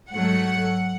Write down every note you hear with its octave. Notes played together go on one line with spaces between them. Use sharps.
G#2 F#3 A3 F#5